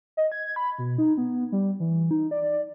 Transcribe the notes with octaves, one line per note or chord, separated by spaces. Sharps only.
D#5
G#6
B5
B2
D#4
B3
G3
E3
D#4
D5